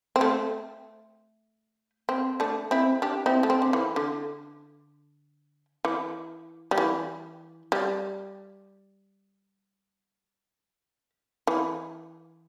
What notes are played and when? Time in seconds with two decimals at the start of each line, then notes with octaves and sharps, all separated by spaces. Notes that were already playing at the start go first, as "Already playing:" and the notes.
0.16 C4
0.21 A3
2.09 C4
2.40 A3 D4
2.71 C4 E4
3.02 D4 G4
3.26 C4 E4
3.43 A3
3.50 C4
3.62 D3
3.73 E3
3.96 D3
5.85 E3
6.71 G3
6.78 E3
7.72 G3
11.47 E3